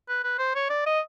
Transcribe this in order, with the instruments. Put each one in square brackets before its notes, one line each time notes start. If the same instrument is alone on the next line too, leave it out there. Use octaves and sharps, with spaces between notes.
[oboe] B4
B4
C5
C#5
D5
D#5